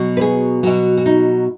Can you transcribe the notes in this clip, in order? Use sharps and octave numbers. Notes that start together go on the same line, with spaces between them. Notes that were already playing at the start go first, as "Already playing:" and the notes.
Already playing: B2 F#3
B4
G#4
B2 F#3 F#4
F#4
D#4